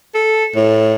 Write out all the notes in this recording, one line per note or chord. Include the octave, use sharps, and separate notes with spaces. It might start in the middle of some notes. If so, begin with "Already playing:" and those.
A4
A2